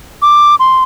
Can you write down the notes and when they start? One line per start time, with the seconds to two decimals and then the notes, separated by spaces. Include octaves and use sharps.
0.22 D6
0.59 C6